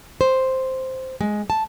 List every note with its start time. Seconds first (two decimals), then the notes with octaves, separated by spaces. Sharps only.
0.21 C5
1.21 G#3
1.50 A5